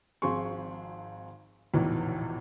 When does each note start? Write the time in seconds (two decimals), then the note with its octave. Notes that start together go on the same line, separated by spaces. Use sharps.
0.22 G#1 F3 C4 G#4 C6 C#6
1.74 E1 A#1 E2 A2 D#3 E3